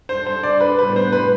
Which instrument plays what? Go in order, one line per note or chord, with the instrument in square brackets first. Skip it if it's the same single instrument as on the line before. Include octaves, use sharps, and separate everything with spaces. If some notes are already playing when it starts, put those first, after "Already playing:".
[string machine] G3 D4 A4 [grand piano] C5
[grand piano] C5
D5
B4
[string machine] A2 G3 B3 D4 [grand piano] B4
[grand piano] C5
B4